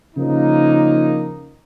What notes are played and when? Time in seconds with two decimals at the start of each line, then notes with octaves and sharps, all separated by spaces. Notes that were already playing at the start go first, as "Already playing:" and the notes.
0.15 C#3 F3 A#3 D#4